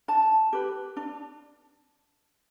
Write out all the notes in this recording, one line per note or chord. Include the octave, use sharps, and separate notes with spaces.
D4 A5
G4 B4
D4